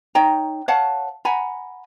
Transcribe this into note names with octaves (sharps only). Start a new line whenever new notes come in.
D#4 C#5 G5 A#5
C#5 F5 F#5 A5
F#5 G#5 A#5 B5